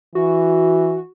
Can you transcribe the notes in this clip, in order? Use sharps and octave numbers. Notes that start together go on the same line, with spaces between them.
E3 F#4